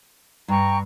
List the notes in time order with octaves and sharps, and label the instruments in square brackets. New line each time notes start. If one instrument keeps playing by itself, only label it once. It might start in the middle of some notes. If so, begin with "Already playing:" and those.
[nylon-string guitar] G2 [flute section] G5 A#5 C#6